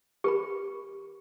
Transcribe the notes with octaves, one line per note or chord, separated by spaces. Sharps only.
G4 A#4 B5